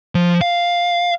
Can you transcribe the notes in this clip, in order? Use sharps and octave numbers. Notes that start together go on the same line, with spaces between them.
F3
F5